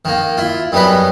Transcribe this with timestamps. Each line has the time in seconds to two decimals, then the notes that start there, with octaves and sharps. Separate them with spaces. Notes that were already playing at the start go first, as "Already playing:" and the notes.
0.05 D#3 A#3
0.37 E4 F4
0.72 F#2 G3 G#3 B3 B4